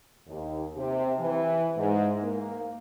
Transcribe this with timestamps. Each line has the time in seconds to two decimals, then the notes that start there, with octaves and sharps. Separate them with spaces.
0.27 D#2
0.76 C3
1.18 E3
1.76 G#2
2.21 A#3